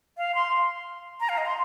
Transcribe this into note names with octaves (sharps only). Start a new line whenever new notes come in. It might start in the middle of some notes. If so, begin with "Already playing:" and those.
F5
C6
A#5
F5
D#5
C6